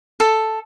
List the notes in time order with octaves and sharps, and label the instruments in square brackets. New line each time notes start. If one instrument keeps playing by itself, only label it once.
[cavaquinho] A4